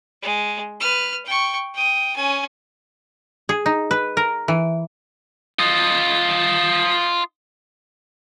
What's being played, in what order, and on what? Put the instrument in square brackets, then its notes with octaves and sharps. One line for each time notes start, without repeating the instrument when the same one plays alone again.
[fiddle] G#3
B4 F6
G5 C#6
G5 D#6
C#4 G#5
[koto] G#4
D#4
B4
A#4
E3
[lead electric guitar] F4 D#5